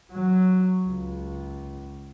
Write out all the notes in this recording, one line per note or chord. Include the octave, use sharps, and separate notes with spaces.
F#3
C#2